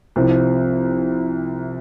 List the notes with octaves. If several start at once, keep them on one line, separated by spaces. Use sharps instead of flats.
C2 C3 F3